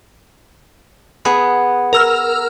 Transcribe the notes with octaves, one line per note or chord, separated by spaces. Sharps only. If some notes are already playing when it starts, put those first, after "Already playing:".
B3 G#4
A#4 E6 F6